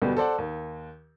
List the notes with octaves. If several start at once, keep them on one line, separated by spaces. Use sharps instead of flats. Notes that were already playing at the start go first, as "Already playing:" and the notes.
D2 B2 G3 B3
A4 C5 D5 F#5
D#2